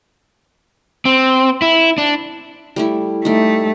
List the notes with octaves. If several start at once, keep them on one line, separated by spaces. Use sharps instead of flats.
C4
E4
D4
G3 A3 E4
G3 A3 D#4